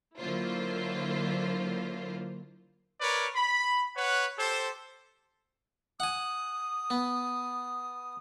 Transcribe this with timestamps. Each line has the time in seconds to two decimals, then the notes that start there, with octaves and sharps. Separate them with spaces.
0.18 D3 F#3 A#3 E4 F4 C5
3.00 A#4 B4 C#5 D5
3.33 B5
3.96 B4 C#5 F#5
4.37 G4 A4 C5
6.00 F#5 G#5 D#6
6.90 B3